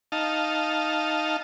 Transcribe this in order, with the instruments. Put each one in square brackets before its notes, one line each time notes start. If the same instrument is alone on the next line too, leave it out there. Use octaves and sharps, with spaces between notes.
[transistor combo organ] D#4 F5 A5